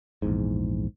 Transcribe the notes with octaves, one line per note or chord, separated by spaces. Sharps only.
A#1 E2 G#2